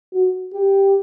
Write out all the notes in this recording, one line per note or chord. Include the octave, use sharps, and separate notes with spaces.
F#4
G4